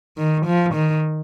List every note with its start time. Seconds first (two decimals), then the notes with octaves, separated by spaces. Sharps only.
0.17 D#3
0.46 F3
0.75 D#3